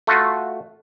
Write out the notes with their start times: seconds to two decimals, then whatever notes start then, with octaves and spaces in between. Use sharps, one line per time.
0.07 A3 F4 F#4